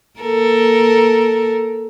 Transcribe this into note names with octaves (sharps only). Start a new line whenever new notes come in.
A#3 A4 A#4